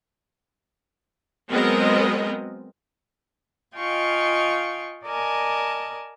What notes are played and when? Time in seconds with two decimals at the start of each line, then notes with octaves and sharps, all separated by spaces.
1.49 F#3 G#3 B3 C4 A#4 D#5
3.75 F4 D#5 F5 G5 G#5 C#6
5.05 A#4 D5 D#5 G#5 A5